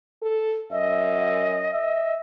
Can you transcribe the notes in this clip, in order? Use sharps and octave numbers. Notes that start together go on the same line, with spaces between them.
A4
F#2 D#5 E5
E5